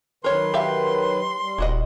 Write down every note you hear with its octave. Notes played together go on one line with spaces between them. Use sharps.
D#3 F#3 A#4 B4 C#5 C6
G4 E5 F5
G3
D#1 E4 F#4 D#5